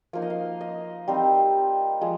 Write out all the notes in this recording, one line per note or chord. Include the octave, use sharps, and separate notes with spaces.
F3 A#3 D#4 F5
D#5
F5
D#5
G3 C4 D#4
F3 G#3